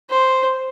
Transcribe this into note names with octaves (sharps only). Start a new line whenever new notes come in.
C5